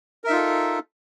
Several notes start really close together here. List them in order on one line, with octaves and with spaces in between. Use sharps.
A#4 E5 D#4 F4 A4